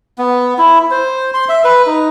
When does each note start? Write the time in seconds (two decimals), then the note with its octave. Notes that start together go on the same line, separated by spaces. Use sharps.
0.18 B3
0.58 E4
0.91 C5
1.34 C6
1.49 E5
1.64 B4
1.87 D#4